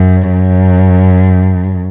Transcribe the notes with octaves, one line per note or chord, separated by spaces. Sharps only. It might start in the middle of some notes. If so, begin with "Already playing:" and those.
Already playing: F#2
F#2